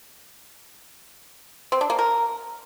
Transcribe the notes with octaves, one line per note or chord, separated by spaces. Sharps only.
C4
D4
A#3
A#4